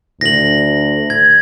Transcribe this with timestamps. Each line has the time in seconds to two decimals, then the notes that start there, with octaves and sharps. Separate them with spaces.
0.21 D2 A#6 F#7
1.10 G#6